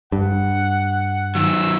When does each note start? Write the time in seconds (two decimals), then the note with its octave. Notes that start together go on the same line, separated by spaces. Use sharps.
0.12 G2 F#5
1.35 D#3 F#3 E6